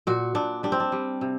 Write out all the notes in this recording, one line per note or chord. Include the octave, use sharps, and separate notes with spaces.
A#2 F#4
A#2 D4
G3 D4
C4
D4
G3
C3